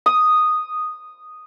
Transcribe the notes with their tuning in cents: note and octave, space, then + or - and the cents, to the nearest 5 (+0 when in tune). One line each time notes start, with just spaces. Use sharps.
D#6 -5